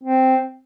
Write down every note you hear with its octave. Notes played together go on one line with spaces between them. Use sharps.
C4